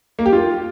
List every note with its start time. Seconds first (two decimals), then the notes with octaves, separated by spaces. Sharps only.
0.19 A#3
0.26 G4
0.33 F4